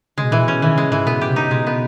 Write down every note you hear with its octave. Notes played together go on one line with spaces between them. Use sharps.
C#3 G#3
B2
A#2 E3
B2
C#4
D#3 E3
C#3 G#3
G#2 E3
B2 B3
G4
C#3
D#4
B2 G#3
B3